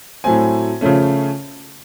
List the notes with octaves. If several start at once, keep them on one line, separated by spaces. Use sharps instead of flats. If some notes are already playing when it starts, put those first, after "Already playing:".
A2 F#3 A3 C4 G#5
C#3 F3 A3 C#4